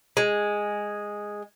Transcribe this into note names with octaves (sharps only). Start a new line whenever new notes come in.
G#3